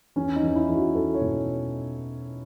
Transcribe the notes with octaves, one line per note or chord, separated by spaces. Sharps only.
E2 C#4
D#4
E2
E4
E2
F#4
E2 A4
C#5
B2